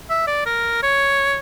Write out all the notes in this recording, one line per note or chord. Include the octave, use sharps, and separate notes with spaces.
E5
D5
A#4
C#5